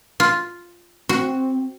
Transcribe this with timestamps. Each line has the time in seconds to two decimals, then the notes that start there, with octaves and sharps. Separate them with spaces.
0.20 F4
1.09 C4 F#4